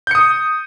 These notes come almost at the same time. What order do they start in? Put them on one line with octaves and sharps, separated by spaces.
G6 C#7 D#6